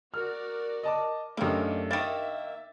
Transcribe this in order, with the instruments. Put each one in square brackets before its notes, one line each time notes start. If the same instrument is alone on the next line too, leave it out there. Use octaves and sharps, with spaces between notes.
[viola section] F#4 A#4 D5 [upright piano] F6
[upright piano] D#5 A5 D6
[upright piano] F#2 A3 [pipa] D#3 A#3 [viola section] D4 D#4 G4
[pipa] D#3 A#3 [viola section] E5 [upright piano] A6 E7